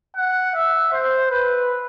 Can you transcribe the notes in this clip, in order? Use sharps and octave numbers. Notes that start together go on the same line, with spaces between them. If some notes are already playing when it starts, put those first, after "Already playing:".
F#5
E5
C5
B4